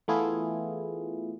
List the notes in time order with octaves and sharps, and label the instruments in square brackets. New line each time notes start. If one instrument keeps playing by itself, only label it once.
[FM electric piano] E3 A3 B3 E4 F4 G#4